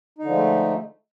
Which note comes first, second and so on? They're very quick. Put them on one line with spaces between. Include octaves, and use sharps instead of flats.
D#4 D3 F3 G#3 A3